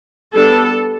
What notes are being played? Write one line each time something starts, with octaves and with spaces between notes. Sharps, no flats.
G3 B3 D4 A4